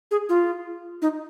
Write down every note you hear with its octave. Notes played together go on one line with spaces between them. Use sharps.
G#4
F4
D#4